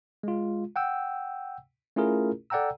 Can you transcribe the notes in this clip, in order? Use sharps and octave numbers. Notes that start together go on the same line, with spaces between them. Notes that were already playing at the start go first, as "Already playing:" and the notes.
G#3 F4
F#5 G5 E6
A3 C#4 E4 F4 G#4 A#4
A4 D5 F#5 G5 A#5 E6